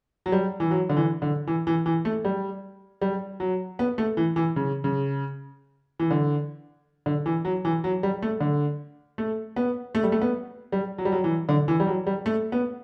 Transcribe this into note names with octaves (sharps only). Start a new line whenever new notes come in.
F#3
G3
E3
F#3
D3
E3
D3
E3
E3
E3
A3
G3
G3
F#3
B3
A3
E3
E3
C#3
C#3
E3
D3
D3
E3
F#3
E3
F#3
G3
A3
D3
A3
B3
A3
G3
A3
B3
G3
F#3
G3
F#3
E3
D3
E3
G3
F#3
G3
A3
B3